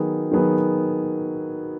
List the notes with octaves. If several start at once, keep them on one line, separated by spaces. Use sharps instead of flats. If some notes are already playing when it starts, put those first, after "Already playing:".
Already playing: D#3 F#3 B3 G#4
D#3 F#3 B3 G#4